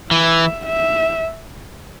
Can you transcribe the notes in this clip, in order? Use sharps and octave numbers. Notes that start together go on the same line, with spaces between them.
E3 E5
E5